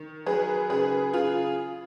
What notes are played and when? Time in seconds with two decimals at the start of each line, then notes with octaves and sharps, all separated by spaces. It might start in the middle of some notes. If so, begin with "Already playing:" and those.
Already playing: D#3
0.26 F#3 G#4 B4
0.70 C#3 G#4 B4
1.13 C#3 F4 G#4